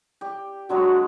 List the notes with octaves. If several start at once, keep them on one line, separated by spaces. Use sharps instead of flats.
G4 D5
D3 F#3 G#3 F#4